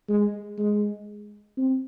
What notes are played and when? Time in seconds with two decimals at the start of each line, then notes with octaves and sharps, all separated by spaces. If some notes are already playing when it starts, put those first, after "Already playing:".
0.09 G#3
0.58 G#3
1.58 C4